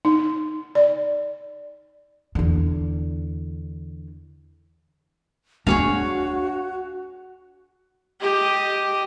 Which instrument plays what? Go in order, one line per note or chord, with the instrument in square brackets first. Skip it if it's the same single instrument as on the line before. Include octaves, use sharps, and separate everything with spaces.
[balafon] D#4
D5
[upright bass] E2 D3
[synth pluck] D2 G#5 [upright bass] D4 [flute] F#4 [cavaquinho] G#4 C#5 F5
[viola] G4 D#5